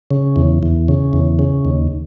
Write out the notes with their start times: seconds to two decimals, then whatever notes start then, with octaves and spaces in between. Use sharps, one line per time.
0.11 C#3
0.36 E2
0.63 E2
0.88 C#3
1.13 E2
1.39 C#3
1.65 D#2